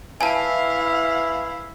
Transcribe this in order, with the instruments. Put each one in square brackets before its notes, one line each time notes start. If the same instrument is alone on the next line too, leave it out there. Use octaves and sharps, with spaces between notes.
[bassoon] E3 [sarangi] E4 [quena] F5 [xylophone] G#5 A5